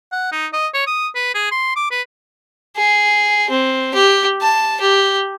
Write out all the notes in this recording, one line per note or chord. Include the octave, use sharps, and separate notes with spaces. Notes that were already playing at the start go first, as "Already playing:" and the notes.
F#5
D#4
D#5
C#5
D#6
B4
G#4
C6
D6
B4
G#4
C4
G4
A5
G4